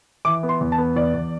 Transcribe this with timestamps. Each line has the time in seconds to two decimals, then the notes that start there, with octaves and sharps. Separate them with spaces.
0.25 E3 D6
0.43 B3
0.49 C6
0.61 E2
0.72 A5
0.78 B3
0.96 E2 D5
1.14 E2